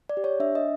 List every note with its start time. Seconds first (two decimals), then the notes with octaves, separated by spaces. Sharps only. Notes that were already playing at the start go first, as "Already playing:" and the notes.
0.09 D5
0.17 G4
0.24 C#5
0.40 D4 E5
0.55 D#5